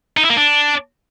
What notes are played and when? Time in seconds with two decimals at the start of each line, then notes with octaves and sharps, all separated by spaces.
0.17 D#4
0.24 E4
0.30 A#3
0.37 D4